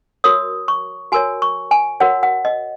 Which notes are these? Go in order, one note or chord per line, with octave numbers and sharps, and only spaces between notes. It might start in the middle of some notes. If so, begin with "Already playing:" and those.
F#4 A#4 C#5 D#6
C#6
F#4 A#4 C#5 G#5
C#6
G#5
F#4 A#4 C#5 F#5
F#5
D#5